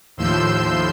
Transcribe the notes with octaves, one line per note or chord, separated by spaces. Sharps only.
D#2 A2 F3 C6 E6 G6